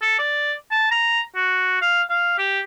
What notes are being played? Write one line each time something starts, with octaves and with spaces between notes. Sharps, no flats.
A4
D5
A5
A#5
F#4
F5
F5
G4